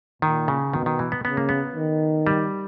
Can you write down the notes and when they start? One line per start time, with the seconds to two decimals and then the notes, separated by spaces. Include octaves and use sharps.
0.22 A#2 D#3
0.48 C#3
0.73 B2 D#3
0.86 D#3
0.99 E3
1.12 B3
1.25 C#3 B3
1.37 A#3
1.49 B3
1.76 D#3
2.27 G3